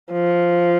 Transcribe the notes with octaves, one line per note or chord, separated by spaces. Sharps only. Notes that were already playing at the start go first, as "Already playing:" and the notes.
F3